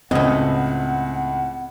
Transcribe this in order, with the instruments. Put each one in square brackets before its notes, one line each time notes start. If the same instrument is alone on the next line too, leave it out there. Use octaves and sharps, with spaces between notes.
[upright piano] C#2 [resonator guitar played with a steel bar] A2 D#5 [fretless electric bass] C4 [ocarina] F#5